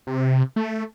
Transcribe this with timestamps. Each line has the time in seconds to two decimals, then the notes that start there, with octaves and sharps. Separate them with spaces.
0.07 C3
0.56 A3